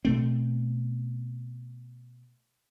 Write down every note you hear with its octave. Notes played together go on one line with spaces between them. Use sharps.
B2 A3 C4